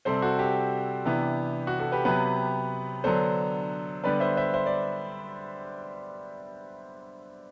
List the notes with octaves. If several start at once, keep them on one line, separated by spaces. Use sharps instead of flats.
C3 G3 C4 A4 C5
F#4 A4
G4
C3 E3 B3 D4
F#4
F#4 A4
G4 B4
C3 F#3 B3 G4 B4
D3 F#3 B3 D4 A4 C5
D3 G3 B3 B4 D5
C5 E5
C5 E5
C5 E5
D5